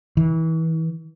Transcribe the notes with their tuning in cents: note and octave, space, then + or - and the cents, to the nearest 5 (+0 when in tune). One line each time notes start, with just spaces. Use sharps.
E3 -30